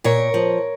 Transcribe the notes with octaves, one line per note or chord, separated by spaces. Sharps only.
A#2 A#4 C#5
F3